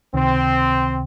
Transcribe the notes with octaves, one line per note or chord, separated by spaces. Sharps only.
C#2 C3 D#3 C4